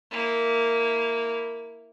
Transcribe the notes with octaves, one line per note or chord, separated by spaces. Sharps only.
A#3 E4